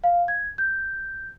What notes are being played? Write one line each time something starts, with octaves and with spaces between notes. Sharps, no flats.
F5
G#6
G6